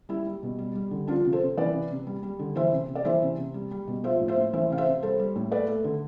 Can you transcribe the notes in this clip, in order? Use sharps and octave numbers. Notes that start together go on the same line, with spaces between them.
G3 E4
G3
B2
G3
G3
D3
F3 D4 F4
C3
A4 C5
C3
E3 B4 D5
C3
C3
G3
G3
D3
E3 C5 E5
C3
C3
D5
E3 C5 E5
C3
C3
G3
G3
B2
F3 C5 E5
A2
C5 E5
A2
E3 C5 E5
C3 F5
C5 E5
C3
G3 A4 C5
G3
A2
A3 B4 D5
A3
D3